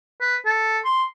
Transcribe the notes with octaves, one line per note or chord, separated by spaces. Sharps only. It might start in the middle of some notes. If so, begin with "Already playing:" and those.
B4
A4
C6